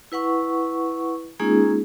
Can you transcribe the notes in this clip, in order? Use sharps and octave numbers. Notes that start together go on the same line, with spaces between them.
E4 B4 F#5 C#6
G#3 A#3 C#4 D#4 F4 G#4